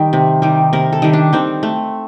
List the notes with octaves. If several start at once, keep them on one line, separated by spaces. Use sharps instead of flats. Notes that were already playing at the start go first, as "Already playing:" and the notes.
Already playing: D#3 G3
C3
D#3 G3
C3 A#4
A4
D#3 G3
D4
D#3 C4
A3